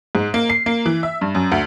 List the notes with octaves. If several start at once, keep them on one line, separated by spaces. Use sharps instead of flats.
G#2
A#3
C7
A#3
E3
E5
G2
F#2
D2